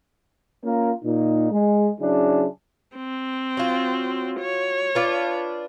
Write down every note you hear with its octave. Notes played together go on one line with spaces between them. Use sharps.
A#3 C#4 F4 A#4
A#2 D#4
G#3
C#3 F#3 C#4 D4 E4 G#4
C4
F#3 F4
C#5
D4 F4 B4